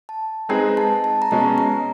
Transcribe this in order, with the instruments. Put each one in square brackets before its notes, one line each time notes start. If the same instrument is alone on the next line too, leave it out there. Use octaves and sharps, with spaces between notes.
[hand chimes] A5
[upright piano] G#3 C4 D#4 G#4 B4 [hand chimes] A#5
[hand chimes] A5
A5
A#5
[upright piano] B2 G#3 C#4 [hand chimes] A5
[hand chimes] A#5